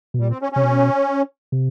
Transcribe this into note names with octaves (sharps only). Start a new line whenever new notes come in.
B2
A#2 G3
C4
C#4
C3 C#4
B2
C3